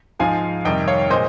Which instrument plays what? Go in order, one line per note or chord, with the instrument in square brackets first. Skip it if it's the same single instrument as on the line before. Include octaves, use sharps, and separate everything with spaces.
[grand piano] G#2 F3 G#3 F5 G#5
F2 C3 D#3 G3 D#5 G5
C#5 F5
A#2 G#3 C5 D#5